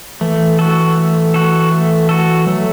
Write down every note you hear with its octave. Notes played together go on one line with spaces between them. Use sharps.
E3 A3
F#4 A4
A3
F#4 A4
A3
F#4 A4
F#3 A3